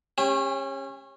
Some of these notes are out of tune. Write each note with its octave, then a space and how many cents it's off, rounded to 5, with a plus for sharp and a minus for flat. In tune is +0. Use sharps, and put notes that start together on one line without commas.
C#4 -25 G4 +35